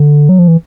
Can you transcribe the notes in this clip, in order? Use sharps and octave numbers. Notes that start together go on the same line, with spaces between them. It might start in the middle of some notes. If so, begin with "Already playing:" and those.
Already playing: D3
F#3
F3
E3